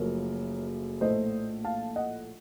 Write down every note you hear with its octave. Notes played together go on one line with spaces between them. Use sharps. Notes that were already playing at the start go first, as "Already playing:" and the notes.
Already playing: F#1 F#2 F3 A3 A#4 C#5
A#1 A2 A3 C5 D#5
F5 A5
D#5 F#5